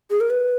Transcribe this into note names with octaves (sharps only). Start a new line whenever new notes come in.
G#4
A#4
B4